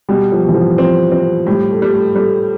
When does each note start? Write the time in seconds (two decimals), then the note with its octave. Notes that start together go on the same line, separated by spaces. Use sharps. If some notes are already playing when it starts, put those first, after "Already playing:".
0.09 B2 G3
0.32 F3
0.44 B2 E3
0.55 F3
0.78 F3 C4
1.12 C4
1.47 A2 G3
1.70 A3
1.82 G3
1.93 A3
2.16 G3 A3